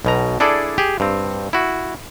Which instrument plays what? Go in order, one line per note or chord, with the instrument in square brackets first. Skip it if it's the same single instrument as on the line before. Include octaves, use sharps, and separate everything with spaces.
[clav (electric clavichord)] B1 B2 A#5
D4 E4 G#4 A4 D5
G4 G#4
G2 C4
E4 F#4